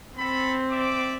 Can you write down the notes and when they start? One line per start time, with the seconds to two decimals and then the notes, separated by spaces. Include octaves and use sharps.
0.18 C4 A4 B5
0.70 D5 E5 D6